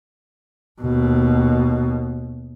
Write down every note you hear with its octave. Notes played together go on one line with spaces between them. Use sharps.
D#2 B2